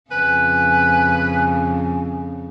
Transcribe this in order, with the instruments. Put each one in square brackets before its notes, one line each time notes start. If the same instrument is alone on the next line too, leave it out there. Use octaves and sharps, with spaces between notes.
[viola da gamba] F2 C#3 [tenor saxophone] B4 [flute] G#5